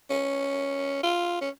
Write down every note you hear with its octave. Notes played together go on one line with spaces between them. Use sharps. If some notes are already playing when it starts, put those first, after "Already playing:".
C#4
F4
C#4